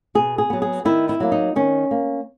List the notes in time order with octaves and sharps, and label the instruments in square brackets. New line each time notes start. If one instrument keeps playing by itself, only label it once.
[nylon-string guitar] B2 G#4
G#4
F#3 B3
G#4
D#3 E4
E4
F#3 A#3
D#4
D#3 C#4
A#3